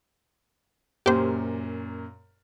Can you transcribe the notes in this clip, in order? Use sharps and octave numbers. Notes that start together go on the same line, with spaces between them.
F#2 A#2 G4 C5